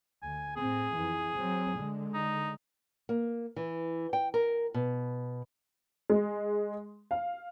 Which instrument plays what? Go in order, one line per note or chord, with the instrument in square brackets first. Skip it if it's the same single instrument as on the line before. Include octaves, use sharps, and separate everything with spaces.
[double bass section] D2 [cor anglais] G#5
[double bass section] A2 C4 [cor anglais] G#4
[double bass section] F2 E3
F#3 C4
D3 G#3
[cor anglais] D#4
[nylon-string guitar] A#3
E3
G5
A#4
B2
[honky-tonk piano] G#3
F5